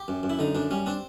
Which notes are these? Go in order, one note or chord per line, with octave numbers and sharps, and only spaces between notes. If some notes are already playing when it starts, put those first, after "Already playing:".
Already playing: G4
F#2
F#2
E4
D3 D#4
F#2 D4
G3 C#4
C4 D4